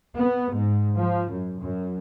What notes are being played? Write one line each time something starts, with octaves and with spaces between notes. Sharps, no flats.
B3
G#2
F3
F#2
F#2